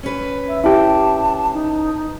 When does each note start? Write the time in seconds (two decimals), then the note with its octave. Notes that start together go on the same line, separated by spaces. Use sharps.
0.03 C#4 B4
0.48 E5
0.64 E4 G4 A5
1.54 D#4